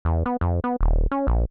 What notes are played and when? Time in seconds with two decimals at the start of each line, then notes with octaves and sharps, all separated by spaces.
0.05 E2
0.26 B3
0.41 F2
0.64 B3
0.81 D#1
1.11 C#4
1.27 A#1